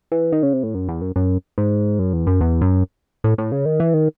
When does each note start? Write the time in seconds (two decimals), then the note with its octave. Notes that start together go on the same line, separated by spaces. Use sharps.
0.12 E3
0.32 D#3
0.43 C#3
0.53 C3
0.63 A2
0.74 F#2
0.88 E2
1.01 F#2
1.16 F#2
1.58 G#2
1.99 F#2
2.13 E2
2.27 F#2
2.41 E2
2.61 F#2
3.24 A2
3.38 A2
3.52 C#3
3.66 D#3
3.80 E3
3.94 D#3